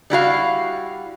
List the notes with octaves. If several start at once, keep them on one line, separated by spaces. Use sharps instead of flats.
G3 E4 F#4 F5